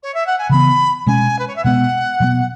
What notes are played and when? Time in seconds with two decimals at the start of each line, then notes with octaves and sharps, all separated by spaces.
0.02 C#5
0.14 E5
0.26 F#5
0.38 G#5
0.49 C#3 E3 B3 B5
1.07 B2 G#3 C#4 G#5
1.38 B4
1.47 C#5
1.55 E5
1.64 B2 G#3 B3 F#5
2.20 B2 F#3 B3